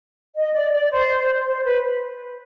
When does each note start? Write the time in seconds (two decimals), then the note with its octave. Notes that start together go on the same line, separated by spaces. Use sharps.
0.36 D#5
0.54 D5
0.73 D5
0.92 C5
1.46 C5
1.64 B4